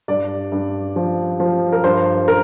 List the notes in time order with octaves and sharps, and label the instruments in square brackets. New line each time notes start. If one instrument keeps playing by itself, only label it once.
[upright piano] G2 D5
G2
F3
F3
A#4
G2 C5
A#4